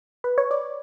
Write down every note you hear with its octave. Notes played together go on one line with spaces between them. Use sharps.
B4
C#5
D5